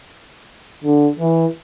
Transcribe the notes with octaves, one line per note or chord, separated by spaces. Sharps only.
D3
E3